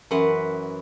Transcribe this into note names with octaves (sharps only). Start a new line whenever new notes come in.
F#2 E3 B4 F#5 C6